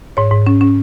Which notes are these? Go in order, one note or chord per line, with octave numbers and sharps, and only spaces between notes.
G#2 C#5
G#2
C#4
C#4